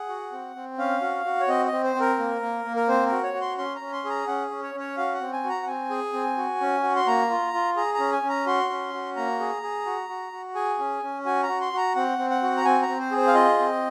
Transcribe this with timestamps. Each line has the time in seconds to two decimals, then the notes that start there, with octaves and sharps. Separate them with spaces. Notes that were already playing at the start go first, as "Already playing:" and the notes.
Already playing: G#4 F#5
0.09 F#4
0.32 C4
0.56 C4
0.78 C#4 F5
1.01 F#4
1.25 F#4
1.41 C#5
1.48 C4 D#5
1.66 D#5
1.72 C4
1.84 C5
1.95 C4
2.00 A#4
2.18 A#3
2.41 A#3
2.64 A#3
2.76 A#4
2.88 C4 C5
3.06 A#4
3.11 F#4
3.23 C#5
3.34 F#4
3.41 C6
3.58 C#4 C6
3.76 A#5
3.81 C#4
3.92 C6
4.05 G#4 A#5
4.27 C#4 F#5
4.51 C#4
4.62 C#5
4.74 C#4
4.80 C#5
4.97 F#4 F5
5.14 F#5
5.21 C4
5.33 G#5
5.44 F#4
5.49 A#5
5.63 F#5
5.67 C4 G#5
5.90 G#4
6.13 C4
6.37 F#4
6.61 C#4
6.83 F#4
6.96 C6
7.07 A#3 A#5
7.30 F4
7.53 F4
7.77 G#4 A#5
7.94 C#4 A#5
8.12 G#5
8.23 C#4
8.29 A#5
8.46 F#4 C6
8.70 C#4
8.94 F#4
9.16 A#3 A#5
9.40 G#4
9.63 G#4
9.86 F#4
10.09 F#4
10.32 F#4
10.55 G#4 G#5
10.79 C#4
11.03 C#4
11.25 F#4 G#5
11.43 A#5
11.48 F#4
11.61 C6
11.73 F#4 A#5
11.95 C4 F#5
12.18 C4
12.30 F#5
12.42 F#4
12.57 A#5
12.65 C4 G#5
12.82 A#5
12.88 C4
13.00 C5
13.11 G#4
13.17 C5
13.27 F5
13.35 F4 D#5
13.59 C4